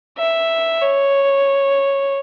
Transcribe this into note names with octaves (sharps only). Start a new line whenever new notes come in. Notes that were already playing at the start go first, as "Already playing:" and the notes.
E5
C#5